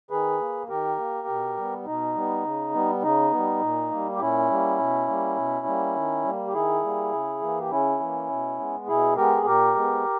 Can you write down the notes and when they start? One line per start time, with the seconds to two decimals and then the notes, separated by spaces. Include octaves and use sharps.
0.11 D#3 G#4 B4
0.40 A#3
0.69 D#3 G4 A#4
0.98 A#3
1.28 B2
1.57 G3 B3
1.86 B2 D#4
2.15 G3 B3
2.45 C#3
2.74 G3 B3
3.02 C#3 D#4
3.32 G3 B3
3.61 A#2
3.91 G3 A#3
4.16 G4
4.20 A#2 C#4 E4
4.50 G3 A#3
4.79 B2
5.08 G3 A#3
5.37 B2
5.66 G3 A#3
5.95 D#3
6.25 G3 A#3
6.47 G4
6.54 D#3 E4 G#4
6.83 G3 A#3
7.12 C#3
7.41 E3 A#3
7.60 G4
7.71 C#3 C#4 E4
8.00 E3 A#3
8.29 B2
8.59 G#3 B3
8.87 B2 E4 G#4
9.16 G#3 B3 G4 A#4
9.37 G#4
9.46 A#2 G4 A#4
9.75 G#3 B3